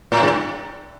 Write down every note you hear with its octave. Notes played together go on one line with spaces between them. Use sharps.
A2
G2